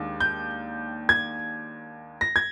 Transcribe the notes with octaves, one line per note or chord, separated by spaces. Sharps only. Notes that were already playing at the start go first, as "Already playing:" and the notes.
Already playing: D#2 D#3 G#3 D4
G6
G#6
A#6
G#6